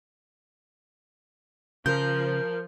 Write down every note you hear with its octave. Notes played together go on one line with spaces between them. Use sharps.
C#3 F3 A#4 G6